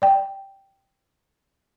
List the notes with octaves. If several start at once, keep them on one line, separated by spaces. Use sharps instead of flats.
D5 G5